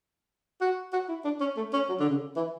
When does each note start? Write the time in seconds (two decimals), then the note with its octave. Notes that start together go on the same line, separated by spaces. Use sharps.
0.61 F#4
0.93 F#4
1.08 E4
1.25 D4
1.40 C#4
1.56 A3
1.73 C#4
1.89 F#3
1.99 D3
2.09 C#3
2.36 E3